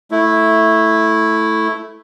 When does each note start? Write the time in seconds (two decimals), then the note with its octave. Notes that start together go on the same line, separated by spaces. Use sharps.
0.11 A3 E4